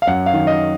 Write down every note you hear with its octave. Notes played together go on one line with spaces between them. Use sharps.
F5
F#2 F#5
F5
D#3
D#5